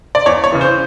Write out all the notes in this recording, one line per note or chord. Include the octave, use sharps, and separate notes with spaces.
D5
E2 C#5
C#5
C#3 E3
C5